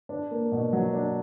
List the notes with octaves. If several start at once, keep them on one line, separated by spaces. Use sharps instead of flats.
D4
A#3
B2
F#3
D4